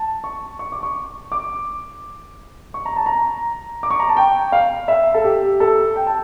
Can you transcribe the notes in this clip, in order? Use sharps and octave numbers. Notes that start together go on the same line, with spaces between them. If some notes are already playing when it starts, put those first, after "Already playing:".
Already playing: A5
C#6
C#6
D6
C#6
D6
C#6
A#5
A5
A#5
D6
C#6
A#5
A5
G5
F5
E5
A4
G4
A4
G5
A5